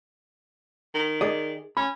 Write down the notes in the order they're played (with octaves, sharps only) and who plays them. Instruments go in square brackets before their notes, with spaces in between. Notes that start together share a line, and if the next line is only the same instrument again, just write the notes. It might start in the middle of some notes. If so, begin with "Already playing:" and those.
[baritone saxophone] D#3
[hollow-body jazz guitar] G#4 D5 D#5
[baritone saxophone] C#4 [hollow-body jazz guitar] B5